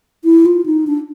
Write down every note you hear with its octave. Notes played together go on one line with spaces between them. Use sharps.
E4
F4
D#4
D4